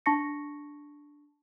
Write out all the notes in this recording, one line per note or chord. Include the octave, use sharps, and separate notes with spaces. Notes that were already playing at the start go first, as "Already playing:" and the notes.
D4 A5 C#6 A#6 C#7